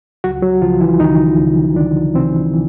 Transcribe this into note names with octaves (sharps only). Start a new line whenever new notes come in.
C#2 F#3 F#4
F#3 F#4
C#2 F3 F4
E3 E4
C#2 D#3 D#4
C#2
C#2 D3 D4
C3 E3 C4
E3